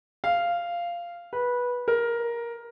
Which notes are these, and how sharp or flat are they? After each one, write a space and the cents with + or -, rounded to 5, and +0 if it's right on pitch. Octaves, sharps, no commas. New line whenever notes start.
F5 -10
B4 -15
A#4 +10